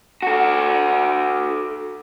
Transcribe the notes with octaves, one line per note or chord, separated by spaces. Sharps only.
F#4 A4